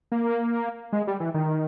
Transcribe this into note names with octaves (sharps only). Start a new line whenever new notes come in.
A#3
G#3
G3
E3
D#3